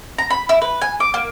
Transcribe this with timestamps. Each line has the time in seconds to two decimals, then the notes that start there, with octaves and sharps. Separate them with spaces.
0.18 A#5
0.30 B5
0.49 E4
0.62 B4
0.82 G#5
1.00 D6
1.14 A#3